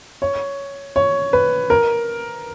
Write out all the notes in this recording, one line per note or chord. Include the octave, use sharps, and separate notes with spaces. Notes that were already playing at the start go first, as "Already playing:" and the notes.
C#5
C#5
B4
A#4